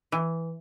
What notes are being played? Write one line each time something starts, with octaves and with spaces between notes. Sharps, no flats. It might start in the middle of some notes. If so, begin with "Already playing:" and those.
E3